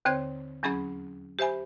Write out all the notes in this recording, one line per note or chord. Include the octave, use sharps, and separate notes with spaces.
D#2 D3 C4 C5 C#5 G#6
E2 F#3 C#4 G#4 B5 G#6
G4 C5 E5 G#5 B5